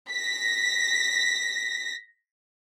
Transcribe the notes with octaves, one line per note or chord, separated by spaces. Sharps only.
A#6 B6